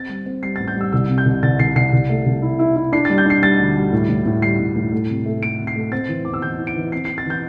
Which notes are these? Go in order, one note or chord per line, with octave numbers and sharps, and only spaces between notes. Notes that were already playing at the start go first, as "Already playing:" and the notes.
Already playing: C4 A6
G3
C4
G3 C7
A1 A6
G6
G3 E6
C2 E6
C3
G6
C2
C2 A6
C2 C7
C2 C7
C2
A3
C2
E4
E4
E4
D4 C7
G3 A6
G6
D4 C7
G3 A6
D2
G3
A2
A2
A2
G3 C7
A2
A2
A3
C3
A3
A3 D7
C3
C7
A3
C4 A6
E3
E2 D6
E6
E3 G6
E4
D7
E3
C4 C7
C4 C7
A6
E3 G6